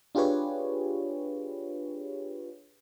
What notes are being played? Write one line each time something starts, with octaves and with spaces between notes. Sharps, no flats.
D4 F4 G4 G#4 B4 C#5